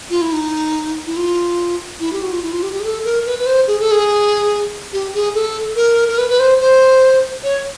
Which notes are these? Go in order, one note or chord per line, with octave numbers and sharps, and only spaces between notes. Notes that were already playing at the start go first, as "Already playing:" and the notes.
F4
E4
D#4
E4
F4
E4
G4
F#4
F4
E4
F4
G4
G4
G#4
A4
A#4
B4
B4
C5
G#4
A4
G#4
G4
G#4
A4
A#4
A#4
B4
B4
C5
C5
C#5